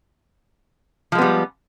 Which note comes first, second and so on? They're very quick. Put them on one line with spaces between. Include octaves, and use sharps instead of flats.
F3 G#3 B3 G3